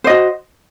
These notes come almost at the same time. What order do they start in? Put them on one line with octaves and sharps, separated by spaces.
C5 D#5 F#4